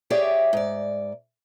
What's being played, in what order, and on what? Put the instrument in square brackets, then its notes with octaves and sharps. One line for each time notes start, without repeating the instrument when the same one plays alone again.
[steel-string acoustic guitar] G4 G#4 C#5 D5 E5 G5
G#2 D5